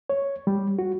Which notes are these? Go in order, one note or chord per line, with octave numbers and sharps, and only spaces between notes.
C#5
G3
F#4